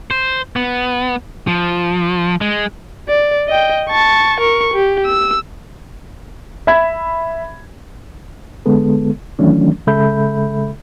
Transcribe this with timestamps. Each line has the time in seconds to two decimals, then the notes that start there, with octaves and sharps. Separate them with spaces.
0.11 C5
0.56 B3
1.47 F3
2.41 G#3
3.08 D5
3.48 D#5 G5
3.89 A5 C#6
4.40 A#4 C#6
4.74 G4
5.06 E6
6.67 E5 B5 G#6
8.66 D3 G#3 B3 A4
9.39 D#3 E3 F#3 A3 C#4 D4
9.87 C#3 G#3 A4 E5 B5 G6